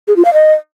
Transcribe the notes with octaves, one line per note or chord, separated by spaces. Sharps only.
G#4
F4
F5
D#5